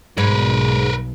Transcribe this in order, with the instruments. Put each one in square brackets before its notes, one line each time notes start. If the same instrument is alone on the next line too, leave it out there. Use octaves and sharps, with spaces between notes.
[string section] B1 [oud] G#2 [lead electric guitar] A#4 B4